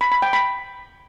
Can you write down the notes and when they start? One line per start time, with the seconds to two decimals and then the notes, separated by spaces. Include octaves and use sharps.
0.01 B5
0.12 B5
0.22 G5
0.33 B5